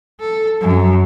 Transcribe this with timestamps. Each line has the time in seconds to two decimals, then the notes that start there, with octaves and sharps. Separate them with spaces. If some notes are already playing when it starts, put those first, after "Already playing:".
0.20 A4
0.61 F#2